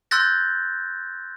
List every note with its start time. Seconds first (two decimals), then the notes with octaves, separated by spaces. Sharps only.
0.11 C6 E6 F#6 G6 A6 A#6